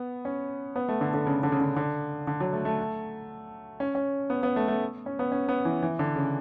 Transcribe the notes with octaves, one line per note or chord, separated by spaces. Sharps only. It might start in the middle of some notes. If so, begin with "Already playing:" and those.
Already playing: B3
C#4
B3
A3
D3
D3
C#3
D3
C#3
D3
D3
D3
F#3
A3
A3
C#4
C#4
B3
B3
A3
A3
C#4
B3
C#4
B3
E3
E3
D3
C#3